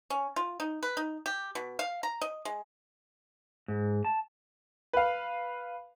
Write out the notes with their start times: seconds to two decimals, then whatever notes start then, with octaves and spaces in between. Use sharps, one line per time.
0.10 C#4
0.36 F4
0.60 D#4
0.83 B4
0.97 D#4
1.26 G4
1.55 B2
1.79 F5
2.03 A#5
2.21 D#5
2.45 G#3
3.68 G#2
4.05 A5
4.93 B4 F5